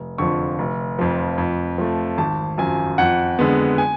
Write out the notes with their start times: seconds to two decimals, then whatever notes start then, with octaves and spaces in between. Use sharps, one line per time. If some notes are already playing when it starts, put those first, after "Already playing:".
Already playing: F1
0.18 F2 D3 F3 C#6
0.59 F1
0.99 F2 F3
1.38 F2
1.78 F3 A3
2.18 G#1 A5
2.58 F#2 F3 G#5
2.98 F2 F#5
3.39 D3 G#3 B3
3.78 G#5